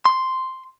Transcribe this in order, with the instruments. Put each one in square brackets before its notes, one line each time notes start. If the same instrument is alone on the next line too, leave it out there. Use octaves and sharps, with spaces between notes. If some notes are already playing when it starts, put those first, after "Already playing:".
[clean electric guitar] C6